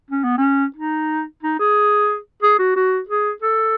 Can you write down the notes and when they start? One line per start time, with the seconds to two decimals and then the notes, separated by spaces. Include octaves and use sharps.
0.10 C#4
0.24 B3
0.38 C#4
0.76 D#4
1.43 D#4
1.59 G#4
2.43 G#4
2.59 F#4
2.76 F#4
3.09 G#4
3.42 A4